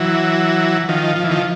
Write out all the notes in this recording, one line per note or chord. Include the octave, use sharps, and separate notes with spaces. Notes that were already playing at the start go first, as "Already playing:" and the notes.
Already playing: E3 F#3
D#3 F3
F3
E3
D#3 F3